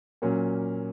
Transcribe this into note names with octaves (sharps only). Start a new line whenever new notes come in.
A#2 F#3 A#3 C#4